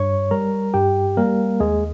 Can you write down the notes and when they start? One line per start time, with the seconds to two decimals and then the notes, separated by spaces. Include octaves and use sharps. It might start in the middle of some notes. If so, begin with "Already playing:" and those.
Already playing: G2 C#5 C#6
0.31 G3 A#4 A#5
0.74 G2 G4 G5
1.17 G3 A#3 A#4
1.60 D#2 G#3 G#4